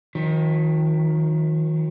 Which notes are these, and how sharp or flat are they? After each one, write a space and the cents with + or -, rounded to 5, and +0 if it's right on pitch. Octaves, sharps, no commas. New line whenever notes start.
D#3 +20 F#3 -45